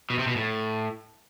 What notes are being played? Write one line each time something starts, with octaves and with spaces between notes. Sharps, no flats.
B2
C3
B2
A2